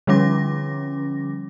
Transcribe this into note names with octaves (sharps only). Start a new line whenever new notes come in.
D3 F3 G3 C#4 D6 A#6